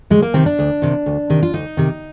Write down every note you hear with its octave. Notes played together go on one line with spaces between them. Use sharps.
D2 G#3
A#3
C3 D#3 C4
D4
D2
C3 D#3
D2
C3 D#3
F4
D2 D#4
C3 D#3